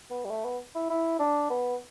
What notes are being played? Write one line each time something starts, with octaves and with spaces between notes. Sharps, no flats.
B3
G3
A3
B3
E4
E4
D4
B3